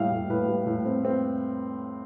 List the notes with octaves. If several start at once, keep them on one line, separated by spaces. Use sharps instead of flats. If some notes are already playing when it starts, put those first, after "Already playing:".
Already playing: A2 G3 E5 F5
A2
A2 B4
G3
A2
C4
C4